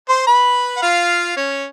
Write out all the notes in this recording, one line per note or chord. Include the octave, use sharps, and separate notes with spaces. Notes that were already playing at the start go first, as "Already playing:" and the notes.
C5 C6
B4 B5
F#5
F4 F5
C#4 C#5